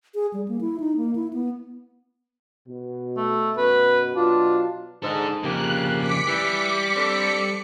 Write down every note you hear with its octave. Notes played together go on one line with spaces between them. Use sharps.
G#4
G3
A#3
E4
D#4
A#3
E4
B3
B2
A3
F#2 B2 B4
B2 F#3 D4 F4
G#2 D4 A4
F2 C#3 A#3 G4 F#6
D6 B6 C#7
E3 G3
C4 D4 A4